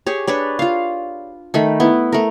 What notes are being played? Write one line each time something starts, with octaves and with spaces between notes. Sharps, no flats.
G4 G#4 C#5
D4 B4 C#5 D5
F4 F5
D#3 A3 B5
B3 E4
A3 A#4